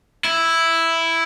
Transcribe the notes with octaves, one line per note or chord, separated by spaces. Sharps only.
E4